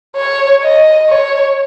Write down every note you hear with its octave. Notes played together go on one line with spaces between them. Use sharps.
C#5
D#5
C#5